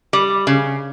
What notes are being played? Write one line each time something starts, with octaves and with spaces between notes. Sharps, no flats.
G3
C#3